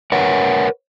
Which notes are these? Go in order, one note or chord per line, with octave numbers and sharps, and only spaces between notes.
A#4 B4 C#5 F#5